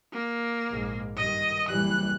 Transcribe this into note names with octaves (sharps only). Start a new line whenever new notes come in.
A#3
A#1 G#2
G2 D#3 D#5
F#1 E3 G3 F#6